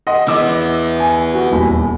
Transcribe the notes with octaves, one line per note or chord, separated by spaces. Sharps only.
D#5 F#5 C6
E3 B3 D#5 D6 E6
G#5
F#4
D#1 E2 B5